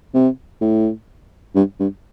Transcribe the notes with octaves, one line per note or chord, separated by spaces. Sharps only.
C3
A2
G2
G2